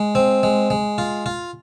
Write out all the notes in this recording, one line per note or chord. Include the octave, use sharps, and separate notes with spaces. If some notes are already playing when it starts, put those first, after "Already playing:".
Already playing: G#3
C4
G#3
G#3
F4
F4